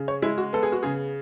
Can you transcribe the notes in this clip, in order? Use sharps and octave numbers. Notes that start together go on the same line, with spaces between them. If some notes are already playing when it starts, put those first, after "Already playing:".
Already playing: C#3
C#5
G#3 E4
F#4
B3 A4
G#4
F#4
C#3 G#4